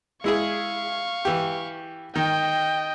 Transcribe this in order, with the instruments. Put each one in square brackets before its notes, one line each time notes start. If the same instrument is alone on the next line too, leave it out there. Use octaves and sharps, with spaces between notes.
[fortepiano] G#3 E4 G#4 [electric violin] F5 C#6
[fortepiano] E3 G4
[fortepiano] D#3 [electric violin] D#5 G5